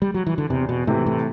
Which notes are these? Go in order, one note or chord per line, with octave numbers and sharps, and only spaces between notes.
G3
F#3
E3
D3
E2 C3
B2
A2 C3 E3
A2